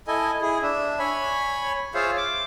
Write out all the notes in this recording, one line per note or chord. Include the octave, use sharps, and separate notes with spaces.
E4 A4 D#5 G#5
E4 G#4
D4 E5
C#5 G#5 B5
F4 G#4 C5 C#5 E5 F5
D6